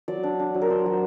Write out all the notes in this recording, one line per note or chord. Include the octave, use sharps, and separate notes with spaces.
F#3 D5
D4
D4
F#3
A#4
D4 C5
F#3